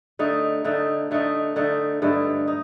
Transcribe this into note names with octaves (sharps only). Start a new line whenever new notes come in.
D3 A3 D#4
D3 A3 D#4
D3 A3 D#4
D3 A3 D#4
G2 D3 A3 D#4
D#4